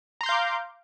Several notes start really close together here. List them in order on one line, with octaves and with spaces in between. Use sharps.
A#5 C6 G6 F5 D6